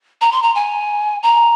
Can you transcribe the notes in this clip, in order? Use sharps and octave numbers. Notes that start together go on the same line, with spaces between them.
A#5
C6
A#5
G#5
A#5